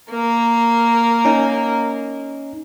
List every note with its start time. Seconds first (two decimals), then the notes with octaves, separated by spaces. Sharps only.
0.10 A#3 A#4
1.25 C#4 D#4